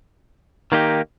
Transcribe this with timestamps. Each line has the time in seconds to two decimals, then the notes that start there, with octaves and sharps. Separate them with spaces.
0.72 D#3 A#3 D#4 G4